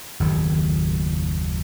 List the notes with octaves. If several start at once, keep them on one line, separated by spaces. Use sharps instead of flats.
F#1 D#2 A2 D#3